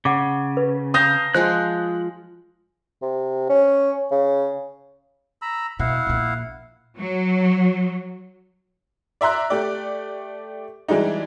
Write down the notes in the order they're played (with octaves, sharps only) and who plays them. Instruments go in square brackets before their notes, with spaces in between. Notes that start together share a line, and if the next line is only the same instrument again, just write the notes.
[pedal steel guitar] C#3 [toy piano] F#5 D6
[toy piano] B4
[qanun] F5 A5 A#5 [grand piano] D#6 G6 A#6
[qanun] F3 G#3 F4 [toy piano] C5 [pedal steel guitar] F#6
[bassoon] C3
C#4
C#3
[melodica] A#5 B5 E6
[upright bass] B2 [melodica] E4 F5 F#5
[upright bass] A#1 A#3
[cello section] F#3
[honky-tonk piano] D5 E5 A#5 C6 F#6
A3 G4 D5
E3 G3 G#3 D4 D#4